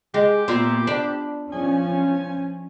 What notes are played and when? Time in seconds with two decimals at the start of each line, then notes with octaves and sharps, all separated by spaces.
0.14 G#3 G4
0.48 A#2 B3 F4 E5
0.87 D4 B5
1.53 F3 C#4 G#5